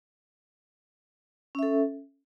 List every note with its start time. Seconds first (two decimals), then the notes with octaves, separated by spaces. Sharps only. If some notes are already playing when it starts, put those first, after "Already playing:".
1.55 C#4
1.59 E5
1.63 A4